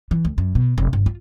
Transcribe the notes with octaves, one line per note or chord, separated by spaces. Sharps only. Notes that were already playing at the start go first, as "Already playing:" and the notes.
E3
D2
F#2
B2
F1
G1
F4